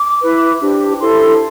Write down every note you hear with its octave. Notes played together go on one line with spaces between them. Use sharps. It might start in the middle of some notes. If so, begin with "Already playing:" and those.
Already playing: D6
E4 B4
D4 G4 C5
E4 A4 C5 C6